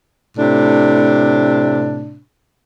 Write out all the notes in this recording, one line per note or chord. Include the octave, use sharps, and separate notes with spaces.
A2 C3 D4